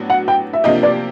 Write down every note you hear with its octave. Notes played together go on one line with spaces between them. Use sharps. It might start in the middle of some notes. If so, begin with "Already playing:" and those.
Already playing: A2 F#3 B3 D4
F#5
G5
E5
C3 F3 A#3 D4 G4 D#5
D5